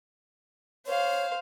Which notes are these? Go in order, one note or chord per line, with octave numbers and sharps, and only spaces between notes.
C5 C#5 F5